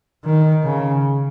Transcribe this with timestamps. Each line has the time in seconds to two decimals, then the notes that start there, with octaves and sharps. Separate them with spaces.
0.25 D#3
0.64 C#3